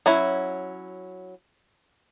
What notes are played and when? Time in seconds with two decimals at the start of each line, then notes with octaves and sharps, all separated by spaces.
0.06 F#3 C#4 E4